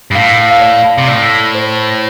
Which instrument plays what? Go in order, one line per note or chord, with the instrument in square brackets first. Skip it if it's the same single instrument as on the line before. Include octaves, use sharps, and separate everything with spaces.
[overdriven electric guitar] G2
[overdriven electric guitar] A2 [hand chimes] F5
[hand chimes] F5
D5
[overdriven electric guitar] C3
[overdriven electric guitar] A2 [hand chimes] D5
[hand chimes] C5